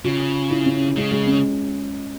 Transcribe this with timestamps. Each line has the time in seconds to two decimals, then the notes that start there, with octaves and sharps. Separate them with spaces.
0.05 C#3 F4
0.50 E4
0.66 C#4
0.96 C#3 G#3
1.12 G#3
1.27 C#4